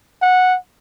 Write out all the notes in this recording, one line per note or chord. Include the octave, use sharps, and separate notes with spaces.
F#5